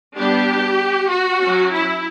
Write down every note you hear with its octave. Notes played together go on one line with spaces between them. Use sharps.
G3 B3 D4 G4
F#4
F#3 C#4
E4